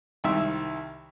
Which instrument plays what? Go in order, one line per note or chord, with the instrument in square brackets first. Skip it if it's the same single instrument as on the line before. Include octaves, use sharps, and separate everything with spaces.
[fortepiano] C2 D#3 E5